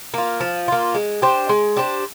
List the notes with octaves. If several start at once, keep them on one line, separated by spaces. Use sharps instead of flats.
A#3 F4
F3
A#3 F4
G#3
D4 G4 C5
G#3
D4 G4 C5